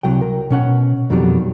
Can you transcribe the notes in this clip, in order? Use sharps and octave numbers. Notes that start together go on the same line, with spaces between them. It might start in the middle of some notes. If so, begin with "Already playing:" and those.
C2 F#3 G5
A#4
B2 C#4 F#5
F2 B2 D#3 F#3 G3